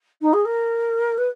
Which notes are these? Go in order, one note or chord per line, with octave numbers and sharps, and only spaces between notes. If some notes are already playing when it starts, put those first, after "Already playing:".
D#4
G#4
A#4
B4